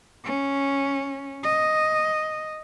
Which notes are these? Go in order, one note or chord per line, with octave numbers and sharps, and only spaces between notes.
C#4
D#5